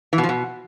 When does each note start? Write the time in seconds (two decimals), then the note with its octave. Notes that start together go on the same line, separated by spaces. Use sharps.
0.13 E3
0.18 B2
0.23 F3
0.29 B2